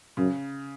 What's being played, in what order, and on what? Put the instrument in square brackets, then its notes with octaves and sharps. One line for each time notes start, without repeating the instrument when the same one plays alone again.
[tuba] F#2 [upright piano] C#3